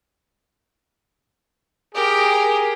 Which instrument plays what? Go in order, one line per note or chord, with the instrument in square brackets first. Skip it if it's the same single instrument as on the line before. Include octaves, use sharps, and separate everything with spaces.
[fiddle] G4 A#4 [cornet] G#4